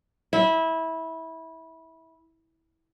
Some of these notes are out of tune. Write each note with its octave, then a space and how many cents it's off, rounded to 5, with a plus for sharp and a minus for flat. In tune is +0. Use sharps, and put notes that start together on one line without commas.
E4 -20